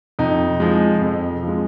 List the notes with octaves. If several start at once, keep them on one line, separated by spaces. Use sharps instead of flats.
F2 D#4
F3 G#3
F2
F3
G#3